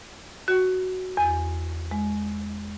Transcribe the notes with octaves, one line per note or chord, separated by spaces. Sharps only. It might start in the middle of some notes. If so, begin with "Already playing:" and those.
F#4
E2
G#3